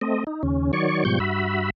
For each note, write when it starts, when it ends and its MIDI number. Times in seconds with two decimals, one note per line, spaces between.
0.01 0.24 57
0.01 0.24 60
0.01 0.24 75
0.27 0.43 63
0.43 0.71 39
0.43 0.71 49
0.43 0.71 61
0.73 1.04 51
0.73 1.04 54
0.73 1.04 73
0.73 1.04 74
0.73 1.04 85
1.05 1.19 44
1.05 1.19 47
1.05 1.19 53
1.05 1.19 55
1.05 1.19 85
1.05 1.19 91
1.20 1.70 43
1.20 1.70 66
1.20 1.70 76
1.20 1.70 83